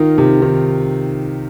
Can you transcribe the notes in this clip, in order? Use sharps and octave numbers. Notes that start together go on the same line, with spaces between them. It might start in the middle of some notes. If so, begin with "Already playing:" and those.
Already playing: D#3 D#4 F4
C3
D#3